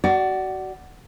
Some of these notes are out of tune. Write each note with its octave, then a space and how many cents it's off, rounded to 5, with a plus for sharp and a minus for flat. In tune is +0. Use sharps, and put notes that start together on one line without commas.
F#4 +25 D5 +0